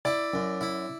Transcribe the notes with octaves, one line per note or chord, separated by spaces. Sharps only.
E4 D5
F#2
E4